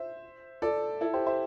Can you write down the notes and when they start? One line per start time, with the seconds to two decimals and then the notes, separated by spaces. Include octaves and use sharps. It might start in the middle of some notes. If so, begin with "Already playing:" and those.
Already playing: C5 E5
0.62 A4 D5
1.01 E4 A4
1.13 G4 C5
1.26 C5 E5